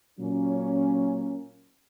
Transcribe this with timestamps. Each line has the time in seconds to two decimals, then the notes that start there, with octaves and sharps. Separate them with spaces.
0.19 A#2 F#3 A#3 C#4